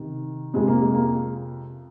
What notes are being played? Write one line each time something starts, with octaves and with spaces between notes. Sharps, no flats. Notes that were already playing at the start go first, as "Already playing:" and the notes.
Already playing: C3 D#3
F2 C3 F3 G#3
A#3
G#3
A#3